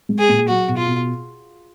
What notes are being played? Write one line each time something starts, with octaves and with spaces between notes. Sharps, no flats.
G#3
G#4
A#2
F#3 F#4
B2
F4
B2